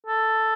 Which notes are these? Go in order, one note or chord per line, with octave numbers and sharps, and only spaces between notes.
A4